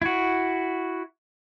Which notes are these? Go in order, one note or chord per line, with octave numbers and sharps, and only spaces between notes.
E4 F#4